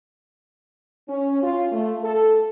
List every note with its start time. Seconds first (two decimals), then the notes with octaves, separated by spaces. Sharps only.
1.08 C#4
1.42 F4
1.72 A3
2.03 A4